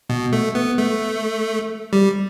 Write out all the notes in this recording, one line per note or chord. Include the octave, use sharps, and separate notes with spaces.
B2
A3
B3
A3
G3